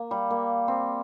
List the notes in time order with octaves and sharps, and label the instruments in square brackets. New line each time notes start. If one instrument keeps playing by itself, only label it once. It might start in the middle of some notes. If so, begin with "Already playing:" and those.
Already playing: [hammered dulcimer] A#3
G3
A#3
C4